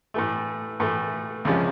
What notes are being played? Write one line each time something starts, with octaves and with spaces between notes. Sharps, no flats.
A2 E3 A3
A2 E3 A3
C#2 C3 F3 G#3 C#4